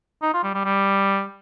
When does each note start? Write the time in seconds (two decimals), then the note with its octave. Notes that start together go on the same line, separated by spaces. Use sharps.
0.22 D#4
0.34 F4
0.43 G3
0.54 G3
0.65 G3